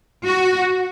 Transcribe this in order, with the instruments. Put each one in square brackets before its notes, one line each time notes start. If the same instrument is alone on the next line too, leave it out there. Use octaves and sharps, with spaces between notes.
[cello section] F#4